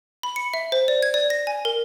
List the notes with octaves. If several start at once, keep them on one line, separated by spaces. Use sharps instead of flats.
B5
C#7
E5
C5
D5
G#6
D5
A#6
G#5
A#4